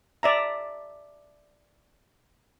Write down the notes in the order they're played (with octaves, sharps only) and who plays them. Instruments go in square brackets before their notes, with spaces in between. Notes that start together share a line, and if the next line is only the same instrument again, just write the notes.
[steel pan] D5 E5 A#5